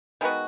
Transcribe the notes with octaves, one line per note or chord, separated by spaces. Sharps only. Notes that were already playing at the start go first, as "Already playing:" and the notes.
D#3 G#3 B3 F#4